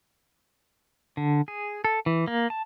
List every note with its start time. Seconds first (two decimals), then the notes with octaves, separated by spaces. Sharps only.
1.17 D3
1.48 G#4
1.84 A4
2.06 E3
2.28 A#3
2.50 A5